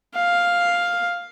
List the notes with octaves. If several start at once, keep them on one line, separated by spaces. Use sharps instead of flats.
F5